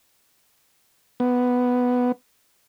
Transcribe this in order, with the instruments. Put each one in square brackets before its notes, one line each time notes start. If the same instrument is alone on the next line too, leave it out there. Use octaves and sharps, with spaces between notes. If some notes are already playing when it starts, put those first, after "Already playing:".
[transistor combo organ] B3